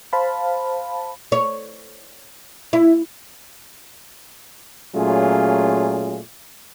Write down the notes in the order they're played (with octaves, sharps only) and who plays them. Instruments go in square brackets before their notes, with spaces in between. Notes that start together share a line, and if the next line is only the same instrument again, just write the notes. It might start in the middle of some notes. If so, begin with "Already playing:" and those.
[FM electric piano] C5 F5 A5 B5
[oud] C#5
E4
[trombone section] A#2 F#3 A3 C#4 F4 G#4